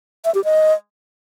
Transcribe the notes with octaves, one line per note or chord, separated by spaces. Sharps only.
E5
G4
D#5